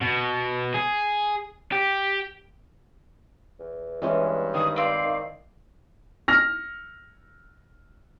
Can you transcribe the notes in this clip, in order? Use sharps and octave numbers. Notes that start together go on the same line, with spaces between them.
B2
G#4
G4
E2
G2 E3 G#3 C#4
D#3 D#6
C4 D5 F5
D#3
F6 A#6